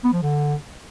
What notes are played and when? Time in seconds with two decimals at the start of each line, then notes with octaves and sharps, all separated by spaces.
0.04 B3
0.13 F3
0.22 D3